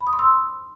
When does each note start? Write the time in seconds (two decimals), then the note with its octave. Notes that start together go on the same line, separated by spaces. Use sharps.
0.01 B5
0.07 D#6
0.13 C6
0.19 E6